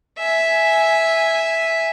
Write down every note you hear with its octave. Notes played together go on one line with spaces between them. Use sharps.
E5 G#5